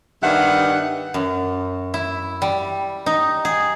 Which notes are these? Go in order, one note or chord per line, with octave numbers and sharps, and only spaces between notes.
G2 D#3 G3 B3 E5 F#5
F#2
E4
G3
D#4
G#4